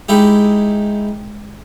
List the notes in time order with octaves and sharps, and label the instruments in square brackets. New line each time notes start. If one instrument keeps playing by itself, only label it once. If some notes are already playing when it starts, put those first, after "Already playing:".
[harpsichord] G#3 D#4 E4 G4